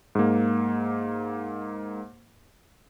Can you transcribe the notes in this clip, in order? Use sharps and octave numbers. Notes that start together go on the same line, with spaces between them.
G#2 A#3